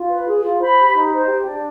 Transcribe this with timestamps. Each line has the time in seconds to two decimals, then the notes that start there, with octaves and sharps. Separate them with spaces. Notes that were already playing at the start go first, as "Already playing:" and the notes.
Already playing: F4
0.09 B4
0.26 G#4
0.43 F4
0.59 C5 B5
0.78 G4
0.94 D#4
1.12 C5
1.28 G4
1.46 D4